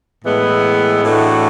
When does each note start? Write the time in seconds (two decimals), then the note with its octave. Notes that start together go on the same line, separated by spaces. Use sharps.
0.24 A2 E3 G#3 B3 E4
1.03 A2 E3 A3 D4 F#4